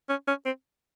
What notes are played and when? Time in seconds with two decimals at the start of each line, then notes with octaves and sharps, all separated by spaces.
0.09 C#4
0.28 C#4
0.45 C4